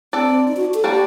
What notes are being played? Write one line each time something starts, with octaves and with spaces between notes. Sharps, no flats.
C4 D4 A4 D5
D#4
F#4
A4
G3 A#3 D4 F#4 G4